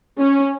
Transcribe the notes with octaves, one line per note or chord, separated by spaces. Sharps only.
C#4